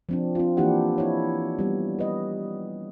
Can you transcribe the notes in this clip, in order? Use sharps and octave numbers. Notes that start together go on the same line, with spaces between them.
F3 C4 D4
C4 F4
E3 A#3 D4 E4 G4 F#5
E4 C#5
G3 B3
B4 D#5